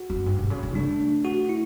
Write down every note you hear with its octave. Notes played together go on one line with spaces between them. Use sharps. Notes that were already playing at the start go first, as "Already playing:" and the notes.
Already playing: F#4
F#2
G2
B2
C#3
C#3
A3 D4
F#4
E4